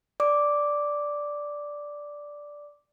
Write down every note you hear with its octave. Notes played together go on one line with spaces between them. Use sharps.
D5 D6